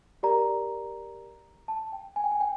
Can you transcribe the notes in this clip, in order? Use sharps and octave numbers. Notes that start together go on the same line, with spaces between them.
G4 A#4 D5 A#5
A5
G5
G#5
G5
G#5
G5